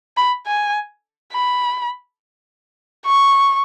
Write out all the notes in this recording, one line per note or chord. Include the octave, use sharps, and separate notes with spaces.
B5
G#5
B5
C#6